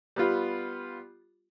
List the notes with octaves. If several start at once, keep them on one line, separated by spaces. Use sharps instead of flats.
G3 B3 F4